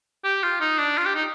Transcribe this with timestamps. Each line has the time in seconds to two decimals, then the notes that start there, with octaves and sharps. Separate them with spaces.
0.24 G4
0.43 F4
0.61 D#4
0.79 D4
0.98 F4
1.06 G4
1.15 D#4